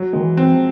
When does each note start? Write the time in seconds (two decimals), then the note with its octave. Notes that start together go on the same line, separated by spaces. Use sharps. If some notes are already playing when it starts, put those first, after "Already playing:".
Already playing: F#3
0.13 D#3 G#3
0.22 E3
0.37 C4
0.53 F3